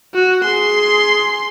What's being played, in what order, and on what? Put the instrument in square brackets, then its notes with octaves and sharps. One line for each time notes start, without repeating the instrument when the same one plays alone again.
[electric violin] F#4
[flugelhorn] G#4 [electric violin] C6